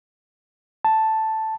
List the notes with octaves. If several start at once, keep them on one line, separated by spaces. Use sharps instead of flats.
A5